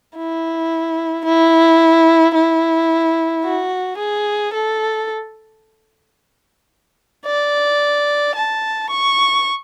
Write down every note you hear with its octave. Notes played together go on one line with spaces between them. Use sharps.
E4
E4
E4
F#4
G#4
A4
D5
A5
C#6